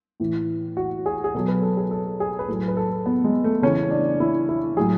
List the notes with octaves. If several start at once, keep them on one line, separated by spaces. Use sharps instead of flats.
A2 E3
F#4
G#4
G#4
B2 F#3 A4
B4
A4
G#4
A4
G#4
B4
A2 F#3 A4
B4
A4
B3
G#3
A3
C#3 E3 C#4
D4
E4
E4
A2 F#3 G#4